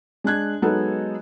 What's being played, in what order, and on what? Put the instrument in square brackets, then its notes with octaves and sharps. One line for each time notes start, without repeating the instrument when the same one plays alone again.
[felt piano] G#3 D4 F#6 G#6
F#3 G#3 B3 D#4 A4